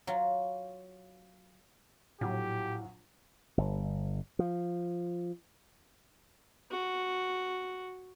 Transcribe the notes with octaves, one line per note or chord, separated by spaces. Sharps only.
F#3 F4
A#1 A2 F#3 G4
G1
F3
F#4